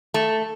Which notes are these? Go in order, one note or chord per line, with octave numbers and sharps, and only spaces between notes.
A3